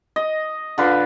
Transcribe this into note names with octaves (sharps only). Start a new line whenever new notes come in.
D#5
D3 F4 B4